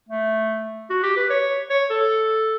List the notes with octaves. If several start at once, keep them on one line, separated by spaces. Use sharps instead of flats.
A3
F#4
G4
B4
C#5
C#5
A4